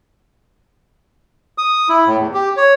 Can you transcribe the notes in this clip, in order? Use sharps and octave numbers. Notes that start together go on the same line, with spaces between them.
D#6
E4
A2
E2
G4
C#5